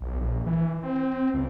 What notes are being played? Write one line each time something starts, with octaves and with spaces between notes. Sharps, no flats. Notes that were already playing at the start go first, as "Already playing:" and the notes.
B1
A#1
E3
C4
C#2